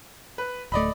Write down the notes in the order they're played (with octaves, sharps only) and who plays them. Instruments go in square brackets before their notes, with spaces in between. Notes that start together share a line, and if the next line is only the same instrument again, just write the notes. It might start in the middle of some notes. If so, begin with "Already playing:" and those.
[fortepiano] B4
[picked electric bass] D1 A3 [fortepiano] D5 D#5 B5